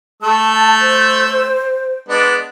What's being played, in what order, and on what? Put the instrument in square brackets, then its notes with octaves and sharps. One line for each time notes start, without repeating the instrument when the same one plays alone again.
[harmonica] A3 E6 [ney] A5
[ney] C5
[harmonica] G#3 B3 D4